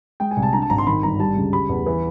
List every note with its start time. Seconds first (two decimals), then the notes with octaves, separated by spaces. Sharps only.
0.20 G#3 G5
0.31 G#5
0.37 C2
0.43 A5
0.53 D3 A#5
0.62 A5
0.70 G#1 A#5
0.78 C6
0.87 D#3 B5
1.03 G1 A#5
1.19 G3 A5
1.36 C#2
1.53 G3 B5
1.69 E2
1.86 E3